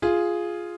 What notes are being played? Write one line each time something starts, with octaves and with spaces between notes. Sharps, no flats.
F4 G#4